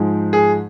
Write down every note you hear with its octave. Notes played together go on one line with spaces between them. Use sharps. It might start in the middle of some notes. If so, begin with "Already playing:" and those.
Already playing: G#2 F3 G#3
G#4